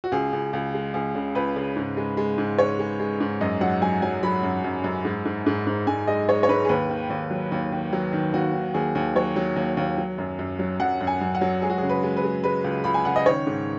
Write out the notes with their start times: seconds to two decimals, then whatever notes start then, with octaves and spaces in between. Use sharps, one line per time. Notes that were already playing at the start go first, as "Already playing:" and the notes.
0.04 F#4
0.12 C#2 G#4
0.33 C#2
0.53 C#2
0.74 G#3
0.94 C#2 G#4
1.15 C#3
1.35 C#2 B4
1.56 C#3
1.76 G#2
1.97 G#3
2.17 G#3
2.38 G#2
2.58 G#3 C#5
2.79 G#3
2.99 G#3
3.20 G#2
3.41 F#2 D#5
3.61 F#3 F#5
3.82 F#3 G#5
4.02 F#3 G#5
4.23 F#3 B5
4.43 F#2
4.64 F#2
4.84 F#2
5.05 G#2
5.25 G#2
5.46 G#2
5.67 G#2
5.87 G#2 G#5
6.07 G#3 D#5
6.28 G#3 C#5
6.43 C#5
6.48 G#2 B4
6.65 G#4
6.69 D#2 B4
6.89 D#3
7.10 D#2
7.31 F#3
7.52 D#2
7.72 D#3
7.93 F#3
8.13 D#3
8.34 D#2 F#4
8.54 D#3
8.74 D#2 G#4
8.95 D#2
9.15 F#3 C#5
9.36 F#3
9.56 D#2
9.77 D#2
9.98 F#3
10.18 F#2
10.39 F#2
10.59 F#3
10.80 F#2 F#5
11.01 F#2
11.07 G#5
11.21 F#2
11.35 F#5
11.41 F#3
11.62 G#3 G#4
11.70 F#4
11.78 C#3 G#4
11.89 B4
12.03 G#3
12.17 B4
12.24 G#3
12.44 G#3 B4
12.64 C#2
12.84 C#2 B5
12.94 G#5
13.05 C#3 F#5
13.16 D#5
13.26 D#3 C#5
13.47 G#2